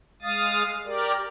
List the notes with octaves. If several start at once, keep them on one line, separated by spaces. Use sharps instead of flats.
G#3 F5 D#6 A6
G4 A#4 D5